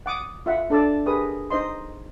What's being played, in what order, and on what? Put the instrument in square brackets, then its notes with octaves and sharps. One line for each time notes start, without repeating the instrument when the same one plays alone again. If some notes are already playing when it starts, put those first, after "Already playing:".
[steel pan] F#5 D6 D#6
F4 E5 F#5
D4 A4 D5 A5 E6
G4 G#4 A#4 B4 D#6
D#4 C5 D#5 C6